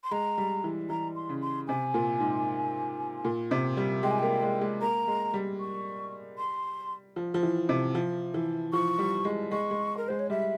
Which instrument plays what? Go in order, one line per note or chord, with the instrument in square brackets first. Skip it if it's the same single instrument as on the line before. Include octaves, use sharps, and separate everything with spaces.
[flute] C6
[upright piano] G#3 [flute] A#5
[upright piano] G3
E3
[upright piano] E3 [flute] A#5
[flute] C6
[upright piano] C#3
[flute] C6
[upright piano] C3 [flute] G#5
[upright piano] A#2
G#2
A#2
C3
G3
[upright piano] G#3 [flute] G5
[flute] G#5
[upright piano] A#3 [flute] G5
[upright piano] G#3
G#3
[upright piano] A#3 [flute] A#5
[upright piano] G#3
G3
[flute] C#6
C6
[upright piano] F3
F3
E3
C3
F3
E3
[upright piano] F3 [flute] C#6
[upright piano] G3
G#3
[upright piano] G#3 [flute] C#6
[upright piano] G#3
[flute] A#4
[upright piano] G#3 [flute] C5
[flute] C#5
[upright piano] G3 [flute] E5